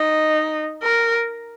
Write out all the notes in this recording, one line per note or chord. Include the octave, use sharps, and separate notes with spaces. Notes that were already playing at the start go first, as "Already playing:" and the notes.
Already playing: D#4
A#4